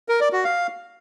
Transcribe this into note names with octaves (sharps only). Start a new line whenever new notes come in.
A#4
D5
F#4
F5